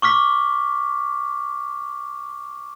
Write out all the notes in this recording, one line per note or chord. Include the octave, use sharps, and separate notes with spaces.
C#6 D6 F6 B6